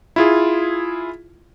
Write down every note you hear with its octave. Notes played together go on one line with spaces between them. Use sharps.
E4 F4 G#4